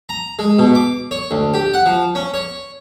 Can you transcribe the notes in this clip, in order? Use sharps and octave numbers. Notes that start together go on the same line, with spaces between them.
A#5
G#3
B2
D6
C#5
D2
G4
F#5
F3
C#4
C#5